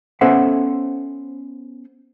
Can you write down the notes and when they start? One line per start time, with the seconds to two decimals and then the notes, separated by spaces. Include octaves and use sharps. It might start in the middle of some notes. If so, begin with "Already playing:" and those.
0.21 B3 C#4 A4 C5 E5 F#5